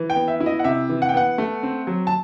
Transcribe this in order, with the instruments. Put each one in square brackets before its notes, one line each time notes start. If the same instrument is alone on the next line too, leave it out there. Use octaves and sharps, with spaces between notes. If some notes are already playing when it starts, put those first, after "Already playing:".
Already playing: [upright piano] E3
G5
B3
E5
E4
D#5
F#5
C3 E5
E3
F#5
G5
B3 F#5
A3
C4
F#3
A5